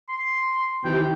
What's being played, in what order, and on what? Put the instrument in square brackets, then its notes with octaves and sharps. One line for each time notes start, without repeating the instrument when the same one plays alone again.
[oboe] C6
[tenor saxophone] C3 [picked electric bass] D#3 E3 [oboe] G5